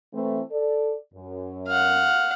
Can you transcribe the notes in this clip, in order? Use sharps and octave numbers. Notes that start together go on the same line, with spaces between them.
E3 A3 C4
A4 D5
F#2
F5 F#5